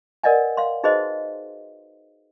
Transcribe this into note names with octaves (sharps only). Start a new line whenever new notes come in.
A#4 B4 D5 D#5 F#5 G#5
F5 C6
D#4 F#4 G#4 B4 C5 D#5